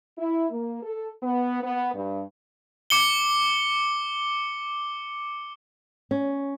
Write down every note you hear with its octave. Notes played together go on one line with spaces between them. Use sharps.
E4
A#3
A4
B3
B3
G2
D6 C#7 G7
C#4